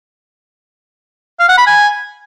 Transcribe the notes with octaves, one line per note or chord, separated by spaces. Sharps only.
F5
F#5
B5
G#5